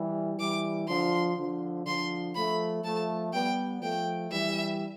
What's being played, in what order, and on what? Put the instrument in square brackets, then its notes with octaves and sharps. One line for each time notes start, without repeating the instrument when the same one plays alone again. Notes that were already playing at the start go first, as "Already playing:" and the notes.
Already playing: [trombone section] E3 G3
[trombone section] E3 G3 [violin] D6
[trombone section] D3 F3 [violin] C6
[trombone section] D3 F3
[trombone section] D3 F3 [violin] C6
[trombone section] F3 A3 [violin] B5
[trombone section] F3 A3 [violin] A5
[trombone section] G3 B3 [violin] G5
[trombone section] F3 A3 [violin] G5
[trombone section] E3 G3 [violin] E5